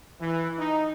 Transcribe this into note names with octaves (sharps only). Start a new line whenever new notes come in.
E3
D#4